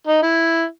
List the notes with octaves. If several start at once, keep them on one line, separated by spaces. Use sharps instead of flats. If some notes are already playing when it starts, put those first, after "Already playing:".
D#4
E4